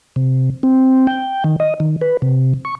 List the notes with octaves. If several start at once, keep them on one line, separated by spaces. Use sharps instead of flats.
C3
C4
G5
D#3
D#5
D#3
B4
C3
C#6